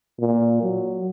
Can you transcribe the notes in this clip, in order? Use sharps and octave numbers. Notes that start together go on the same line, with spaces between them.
A#2
F#3